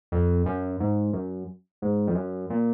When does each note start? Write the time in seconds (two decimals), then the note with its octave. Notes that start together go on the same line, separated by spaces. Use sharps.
0.12 F2
0.46 F#2
0.80 G#2
1.13 F#2
1.82 G#2
2.08 F2
2.15 F#2
2.50 A#2